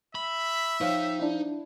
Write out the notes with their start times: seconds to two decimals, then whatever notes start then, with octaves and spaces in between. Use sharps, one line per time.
0.15 E5 B5
0.81 F3 D#4 C#5 F5 G5
1.19 D4 E4